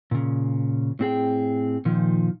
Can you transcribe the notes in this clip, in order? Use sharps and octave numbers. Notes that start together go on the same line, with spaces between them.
A#2 C#3
A2 C4 G#4 G5
A#2 D#3 F3